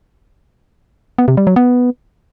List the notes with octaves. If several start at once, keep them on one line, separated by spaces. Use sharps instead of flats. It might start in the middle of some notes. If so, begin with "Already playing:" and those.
B3
C3
G3
F#3
B3